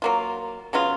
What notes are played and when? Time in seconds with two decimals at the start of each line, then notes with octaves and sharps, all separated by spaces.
0.02 F#3 A#3 F4
0.73 C#3 F#3 B3 F4